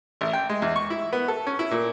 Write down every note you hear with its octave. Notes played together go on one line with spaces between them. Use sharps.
A1
G5
G#3
E2
C#6
E4
B3
A4
C#4
E4
A#2